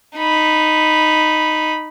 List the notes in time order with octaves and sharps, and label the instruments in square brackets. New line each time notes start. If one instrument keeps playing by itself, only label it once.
[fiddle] D#4 B5